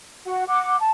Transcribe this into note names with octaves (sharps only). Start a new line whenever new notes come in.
F#4 F#5
F#5 D6
A5